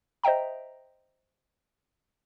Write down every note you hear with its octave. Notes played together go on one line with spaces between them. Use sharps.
C5 D#5 E5 G5 A#5